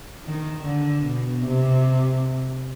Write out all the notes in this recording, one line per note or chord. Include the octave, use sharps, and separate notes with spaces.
D#3
D3
B2
C3